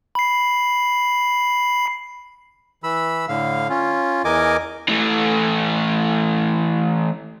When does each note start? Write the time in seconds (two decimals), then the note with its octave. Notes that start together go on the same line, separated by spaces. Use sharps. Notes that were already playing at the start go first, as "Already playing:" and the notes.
0.15 B5 C7
2.84 E3 B5 E6
3.29 A2 D3 F5
3.70 C#4 F4
4.25 E2 E3 A#4 D#5 G#5 D6
4.89 E3 A3